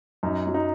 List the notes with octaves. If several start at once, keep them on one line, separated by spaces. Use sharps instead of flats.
F#2 D#4
F#3
D#4